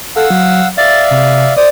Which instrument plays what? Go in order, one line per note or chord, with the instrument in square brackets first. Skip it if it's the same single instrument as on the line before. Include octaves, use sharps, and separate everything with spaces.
[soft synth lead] A4 [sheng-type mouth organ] F5 F#5 E6
[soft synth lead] F#3
[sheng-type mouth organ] D5 E5 F5 [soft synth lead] A6
[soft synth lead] C3
[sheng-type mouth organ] C5 D#6 [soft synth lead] D5